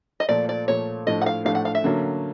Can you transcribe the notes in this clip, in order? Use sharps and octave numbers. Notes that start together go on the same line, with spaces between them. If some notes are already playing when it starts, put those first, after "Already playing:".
D#5
A#2 F3 A3 D5
D5
A#2 F3 A3 C#5
A2 F3 A3 D4 D#5
F#5
F5
A2 F3 A3 D4 F5
F#5
F5
E5
D3 F#3 A#3 C#4